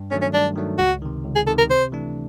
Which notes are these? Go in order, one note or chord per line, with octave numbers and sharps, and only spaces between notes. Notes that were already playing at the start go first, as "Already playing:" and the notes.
Already playing: G2
D#3 F#3 A3 C#4 D4
C#4
G2 D4
D#3 F#3 A3 D4
C#2 F#4
C3 D#3
C#2
G#4
C3 D#3 A4
A#4
C3 C5
E3 A3 D4